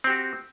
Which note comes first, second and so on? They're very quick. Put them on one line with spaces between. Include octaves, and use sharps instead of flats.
C4 G4 F#4